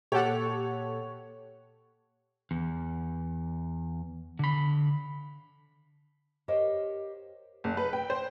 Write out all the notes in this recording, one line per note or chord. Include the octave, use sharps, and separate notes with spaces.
A#2 A#3 G4 A4 C#5 F#5
E2
D3 B5
G4 A#4 C5 C#5 D#5 F5
F#1
B4
G5
C5